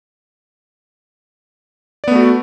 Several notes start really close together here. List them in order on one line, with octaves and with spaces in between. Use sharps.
D5 B3 A3 F#4